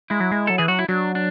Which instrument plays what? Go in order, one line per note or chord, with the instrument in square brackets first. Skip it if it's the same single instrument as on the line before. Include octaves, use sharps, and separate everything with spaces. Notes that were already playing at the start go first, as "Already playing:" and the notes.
[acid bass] G#3 [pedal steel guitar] E4
[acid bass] F#3
G#3
[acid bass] F#3 [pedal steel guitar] A4
[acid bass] E3 [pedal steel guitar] G#4
[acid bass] F#3 [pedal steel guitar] F#4
[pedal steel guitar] E4
[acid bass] F#3 [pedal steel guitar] D4
[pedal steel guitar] D4